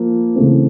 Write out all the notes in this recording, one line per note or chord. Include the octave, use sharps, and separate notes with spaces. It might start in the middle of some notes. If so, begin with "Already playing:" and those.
Already playing: F3 A#3
C#3 E3 A3 C4